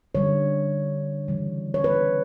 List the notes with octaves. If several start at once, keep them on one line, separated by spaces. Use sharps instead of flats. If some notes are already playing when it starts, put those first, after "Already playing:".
D3 G3 C#5
C#3 E3 G3
C#5
B4